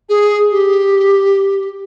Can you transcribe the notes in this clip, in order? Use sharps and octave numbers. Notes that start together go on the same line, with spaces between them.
G#4
G4